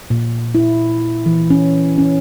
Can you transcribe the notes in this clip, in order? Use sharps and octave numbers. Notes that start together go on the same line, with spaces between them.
A#2
E4
E3
C#4
C#4